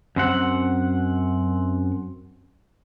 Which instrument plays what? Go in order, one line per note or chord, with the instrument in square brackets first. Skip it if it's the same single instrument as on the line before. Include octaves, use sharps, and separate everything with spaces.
[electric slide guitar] F#2 C4 F#5